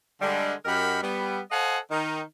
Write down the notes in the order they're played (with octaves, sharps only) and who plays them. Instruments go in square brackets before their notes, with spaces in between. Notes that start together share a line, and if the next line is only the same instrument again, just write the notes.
[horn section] D3 G3 G#3
F#2 G4 A#4 D#5 F#5 B5
G3 B3
A4 C5 D#5 F5 F#5 G#5
D#3 D#4